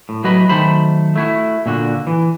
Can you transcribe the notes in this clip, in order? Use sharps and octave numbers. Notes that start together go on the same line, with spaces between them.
A2
A2 F#3 F#4 B4 D#5 B5
D#3 F#3 A3 C5 B5
A3 E4 F#4
A#2 D3 F#4
E3